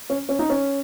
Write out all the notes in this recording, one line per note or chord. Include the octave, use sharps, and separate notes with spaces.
C#4
C#4
D#4
C#4